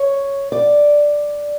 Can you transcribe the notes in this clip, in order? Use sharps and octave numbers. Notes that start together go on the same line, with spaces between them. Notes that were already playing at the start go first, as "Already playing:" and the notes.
Already playing: C#5
D5